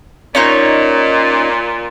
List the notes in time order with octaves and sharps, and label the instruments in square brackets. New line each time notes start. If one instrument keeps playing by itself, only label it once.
[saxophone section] A#2 [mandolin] C#4 D#4 C#5